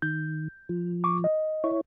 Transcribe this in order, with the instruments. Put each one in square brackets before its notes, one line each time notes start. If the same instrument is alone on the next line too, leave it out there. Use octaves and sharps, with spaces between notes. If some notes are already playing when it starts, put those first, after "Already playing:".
[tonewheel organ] D#3 [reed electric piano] G6
[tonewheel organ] F3
[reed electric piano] C#6 D6
D#5
[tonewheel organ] E4 C#5